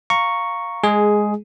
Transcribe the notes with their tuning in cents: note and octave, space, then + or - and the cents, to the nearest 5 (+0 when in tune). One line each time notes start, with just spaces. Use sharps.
F5 +0 A#5 +0 C#6 +0
G#3 +0 G#4 +10